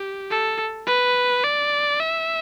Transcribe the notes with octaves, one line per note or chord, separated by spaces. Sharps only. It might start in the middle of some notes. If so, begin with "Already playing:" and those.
Already playing: G4
A4
B4
D5
E5